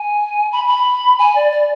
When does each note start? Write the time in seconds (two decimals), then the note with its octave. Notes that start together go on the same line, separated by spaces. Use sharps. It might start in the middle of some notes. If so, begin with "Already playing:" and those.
Already playing: G#5
0.52 B5
0.67 B5
1.18 G#5
1.35 D5
1.51 D5